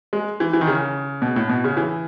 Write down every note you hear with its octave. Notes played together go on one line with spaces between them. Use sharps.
G#3
E3
E3
D#3
C#3
B2
A2
B2
C#3
E3